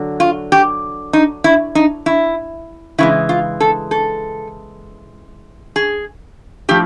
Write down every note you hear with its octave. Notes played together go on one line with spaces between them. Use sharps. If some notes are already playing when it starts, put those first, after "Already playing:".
Already playing: D3 F#3
F4
G4
D#4
E4
D#4
E4
C#3 E3 G#3 E4
F4
A4
A4
G#4
A2 F3 G4